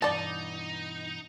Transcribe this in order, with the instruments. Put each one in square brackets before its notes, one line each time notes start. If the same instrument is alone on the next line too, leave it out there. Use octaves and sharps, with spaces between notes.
[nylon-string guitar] G2 B2 E3 [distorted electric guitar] D#4 [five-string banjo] D5 A5